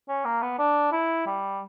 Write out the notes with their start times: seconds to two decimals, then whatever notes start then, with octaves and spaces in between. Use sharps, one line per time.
0.08 C#4
0.25 A#3
0.42 B3
0.59 D4
0.92 E4
1.26 G3